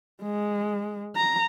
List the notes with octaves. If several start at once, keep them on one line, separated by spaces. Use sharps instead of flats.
G#3
A#5